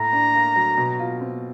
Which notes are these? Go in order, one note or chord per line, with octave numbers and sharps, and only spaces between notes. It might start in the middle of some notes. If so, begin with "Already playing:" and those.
Already playing: A2 A3 A#5
D4
A#3
F#3
B2
F4
C4